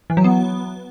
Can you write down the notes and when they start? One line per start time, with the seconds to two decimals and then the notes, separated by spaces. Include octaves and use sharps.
0.10 E3
0.17 F#3
0.24 B3